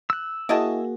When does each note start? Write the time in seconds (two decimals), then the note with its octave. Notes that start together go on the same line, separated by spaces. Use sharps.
0.10 E6 F#6
0.49 A#3 E4 F#4 G#4 D#5 A5